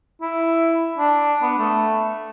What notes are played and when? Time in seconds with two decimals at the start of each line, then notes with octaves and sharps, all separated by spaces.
0.22 E4
0.98 D4
1.42 B3
1.58 A3